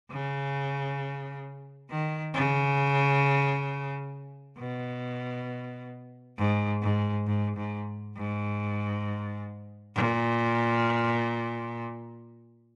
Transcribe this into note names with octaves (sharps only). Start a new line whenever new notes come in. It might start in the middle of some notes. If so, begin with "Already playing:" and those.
C#3
D#3
C#3
B2
G#2
G#2
G#2
G#2
G#2
A#2